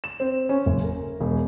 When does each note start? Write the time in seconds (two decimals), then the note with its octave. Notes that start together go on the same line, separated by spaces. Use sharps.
0.04 E7
0.20 C4
0.49 C#4
0.66 F#1
0.83 A#4
1.20 E1